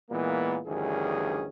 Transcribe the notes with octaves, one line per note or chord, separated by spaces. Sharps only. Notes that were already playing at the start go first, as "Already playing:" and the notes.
A#2 E3 G#3 A#3 B3
D2 G2 D#3 E3 C#4 G#4